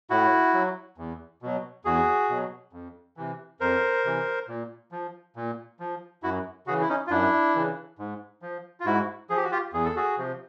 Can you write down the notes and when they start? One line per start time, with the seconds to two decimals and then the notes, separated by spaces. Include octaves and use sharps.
0.10 A2 E4 F#4
0.54 F#3
0.98 E2
1.42 B2 F#3
1.85 E2 F#4 G#4
2.29 B2 F#3
2.73 F2
3.17 C3 E3
3.60 F2 A#4 C5
4.05 C3 E3
4.48 A#2
4.92 F3
5.36 A#2
5.80 F3
6.23 F#2 E4 F#4
6.67 C#3 E3 F#4 G#4
6.81 E4
6.89 C#4 D#4
7.07 F4
7.10 F#2 D4 E4
7.55 C#3 E3
7.99 G#2
8.42 F3
8.80 F4
8.85 G#2 E4 F#4
9.30 F3 G#4
9.37 G4
9.44 F#4
9.51 F4 G4
9.73 E2 G#4
9.85 A4
9.96 F#4 G#4
10.17 C3 F3